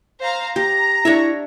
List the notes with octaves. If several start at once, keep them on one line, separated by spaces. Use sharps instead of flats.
C5 F5 A#5
G4 A#5 A#6
D4 E4 C#5 E5